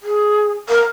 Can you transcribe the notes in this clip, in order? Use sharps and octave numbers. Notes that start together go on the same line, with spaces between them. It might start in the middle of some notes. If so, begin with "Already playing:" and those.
G#4
A#4